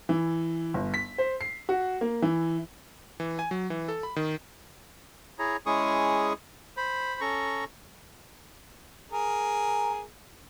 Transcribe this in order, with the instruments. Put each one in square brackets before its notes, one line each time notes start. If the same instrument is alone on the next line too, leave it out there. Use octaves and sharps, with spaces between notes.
[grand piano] E3
G1
B6
C5
C7
F#4
A#3
E3
[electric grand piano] E3
G#5
F#3
E3
A4
B5
D#3
[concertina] E4 G#4 C#5 A#5
G#3 C#4 E4 G#4 C#6 D#6
C5 B5
C#4 A4 A#5 C#6
[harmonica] G#4 A#4